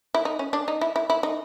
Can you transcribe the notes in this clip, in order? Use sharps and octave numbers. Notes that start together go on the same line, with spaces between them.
E4
D#4
C#4
D4
D#4
E4
E4
E4
D#4